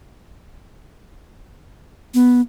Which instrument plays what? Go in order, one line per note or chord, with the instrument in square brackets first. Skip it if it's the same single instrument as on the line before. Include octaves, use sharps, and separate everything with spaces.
[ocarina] B3